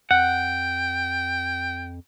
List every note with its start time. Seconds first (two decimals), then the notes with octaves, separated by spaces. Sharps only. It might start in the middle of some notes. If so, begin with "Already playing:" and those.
0.11 F2 F#5 G5